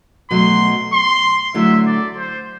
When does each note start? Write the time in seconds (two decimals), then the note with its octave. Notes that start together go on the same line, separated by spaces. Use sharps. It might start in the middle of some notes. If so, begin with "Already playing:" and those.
0.30 B2 F#3 A3 C6
0.93 C6
1.54 D3 F#3 A3 E4 E5
1.87 D5
2.17 C5